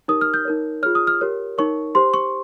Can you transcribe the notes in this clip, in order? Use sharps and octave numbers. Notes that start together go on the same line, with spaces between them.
D#4 G4 A#4 C#5 D#6
F6
G6
D#4 A#4 C#5
F4 G#4 C#5 F6
D#6
F6
G4 A#4 C#5
D#4 A#4 C#5 C#6
G4 C5 C6
C#6